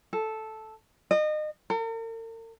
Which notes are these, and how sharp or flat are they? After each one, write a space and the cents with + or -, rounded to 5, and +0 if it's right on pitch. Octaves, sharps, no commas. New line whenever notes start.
A4 -5
D#5 -30
A#4 -45